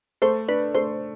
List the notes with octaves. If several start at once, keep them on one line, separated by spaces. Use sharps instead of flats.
A3 C5
D4 B4
A3 C5